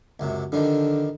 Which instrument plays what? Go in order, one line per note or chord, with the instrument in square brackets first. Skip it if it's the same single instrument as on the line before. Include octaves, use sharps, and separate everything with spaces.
[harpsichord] C#2 F#2 C3
[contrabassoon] D3 [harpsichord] D#3 F3 G3